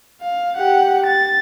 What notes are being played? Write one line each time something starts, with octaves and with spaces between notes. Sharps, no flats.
F5
G4 F#5
A6